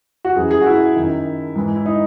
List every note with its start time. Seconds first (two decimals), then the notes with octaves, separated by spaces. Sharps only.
0.24 F#4
0.36 F#2 E3 G#4
0.51 G#4
0.61 F#4
0.66 E4
0.96 F#2 D#3
1.56 G#2 E3
1.76 E4
1.86 D#4